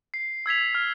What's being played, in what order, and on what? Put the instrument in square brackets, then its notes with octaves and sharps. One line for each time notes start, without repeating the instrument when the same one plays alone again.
[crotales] C7
E6 G#6 B6 F7
F6